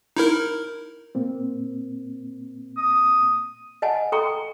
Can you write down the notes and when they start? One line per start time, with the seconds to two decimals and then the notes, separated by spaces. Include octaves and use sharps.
0.17 D#4 E4 A#4
1.15 A#2 A#3 C4
2.77 D#6
3.82 D#5 F#5 G#5 A5
4.12 A4 G5 A#5 C#6